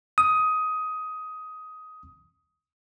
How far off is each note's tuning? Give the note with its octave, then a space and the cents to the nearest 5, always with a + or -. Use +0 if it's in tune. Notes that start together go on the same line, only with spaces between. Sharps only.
D#6 +15